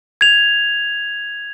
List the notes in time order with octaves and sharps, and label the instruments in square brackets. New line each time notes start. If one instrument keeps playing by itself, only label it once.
[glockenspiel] G#6 F7